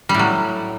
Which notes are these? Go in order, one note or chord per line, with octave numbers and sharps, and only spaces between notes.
G3
A2
F#3